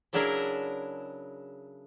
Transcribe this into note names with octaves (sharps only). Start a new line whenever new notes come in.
C#3 F#3 D4 E4 G#4 A#4